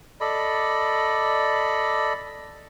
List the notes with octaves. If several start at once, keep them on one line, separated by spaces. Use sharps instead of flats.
A4 D5 D#5 B5